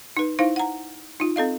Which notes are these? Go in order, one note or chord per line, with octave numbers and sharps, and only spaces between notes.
D#4 B4
D#4 E4 C5 F5
F#5 A#5
D#4 F4
C4 A4 D#5 F5